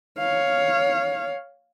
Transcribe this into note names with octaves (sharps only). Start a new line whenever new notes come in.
C#5 F5